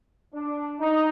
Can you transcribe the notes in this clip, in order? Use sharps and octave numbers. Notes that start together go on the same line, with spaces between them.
D4
D#4